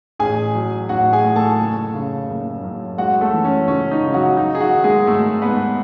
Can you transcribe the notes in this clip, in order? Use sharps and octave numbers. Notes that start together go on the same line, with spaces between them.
A1 G#4 G#5
F#3
A1 F#4 F#5
G#4 G#5
A2
A4 A5
F#1
C#3
F#1
F#2
G#3 F#4 F#5
A3 A4
E3
C#4
C#2 C#4
D#4
C#3
F#3 F#4
F#3 D#4
G#4
F#3 F#4
D#3
G#3 G#4
G#1 A3 A4
G#2 B3 B4